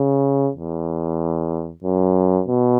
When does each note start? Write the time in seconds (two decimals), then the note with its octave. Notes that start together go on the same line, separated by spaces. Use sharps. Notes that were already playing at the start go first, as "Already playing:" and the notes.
Already playing: C#3
0.56 E2
1.84 F#2
2.48 B2